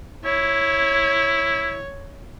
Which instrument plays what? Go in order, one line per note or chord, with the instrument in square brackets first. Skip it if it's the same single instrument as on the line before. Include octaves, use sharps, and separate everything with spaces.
[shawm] E4 [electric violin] C#5